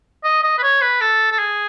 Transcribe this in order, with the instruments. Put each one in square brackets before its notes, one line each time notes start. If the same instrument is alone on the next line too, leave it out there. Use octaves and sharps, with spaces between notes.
[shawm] D#5
D#5
B4
C#5
B4
A4
A4
G#4